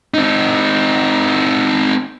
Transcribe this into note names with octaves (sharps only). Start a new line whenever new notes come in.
C4 D#4